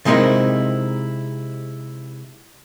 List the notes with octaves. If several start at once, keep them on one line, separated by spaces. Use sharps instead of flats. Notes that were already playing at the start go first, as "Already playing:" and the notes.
C3 G#3 C4 D#4 E4 A#4